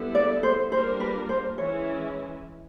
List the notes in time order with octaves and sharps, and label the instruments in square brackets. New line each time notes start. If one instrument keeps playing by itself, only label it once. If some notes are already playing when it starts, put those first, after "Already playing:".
Already playing: [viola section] D3 G3 B3 E4 A4
[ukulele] D5
C5
[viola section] G3 A#3 D4 F4 A#4 [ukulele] C5
[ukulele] B4
C5
[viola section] E3 G#3 C#4 E4 [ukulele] C#5